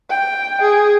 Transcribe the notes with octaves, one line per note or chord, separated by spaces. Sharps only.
G5
G#4